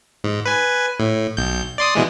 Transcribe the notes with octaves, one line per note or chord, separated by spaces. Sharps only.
G#2
B4 G#5
A2
B1 G6
D5 C6 D#6
B2 E3 G#3